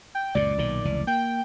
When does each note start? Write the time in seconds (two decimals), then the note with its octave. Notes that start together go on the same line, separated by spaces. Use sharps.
0.15 G5
0.35 C#2 F#2 A#2 D5
0.58 B1 A#2 D#3
0.85 F1 C#2 E3
1.07 A#3 G5